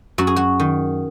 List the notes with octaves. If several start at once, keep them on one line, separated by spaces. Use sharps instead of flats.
F#2 F#4
G#4
F#4
D#3